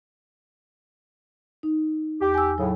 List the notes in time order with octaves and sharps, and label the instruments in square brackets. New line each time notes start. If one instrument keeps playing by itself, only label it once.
[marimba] D#4
[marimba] E2 [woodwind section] G4
[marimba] G#5 E6
[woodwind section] A2 C#3 [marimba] F#3